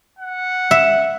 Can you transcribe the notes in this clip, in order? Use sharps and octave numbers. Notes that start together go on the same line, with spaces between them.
F#5
E5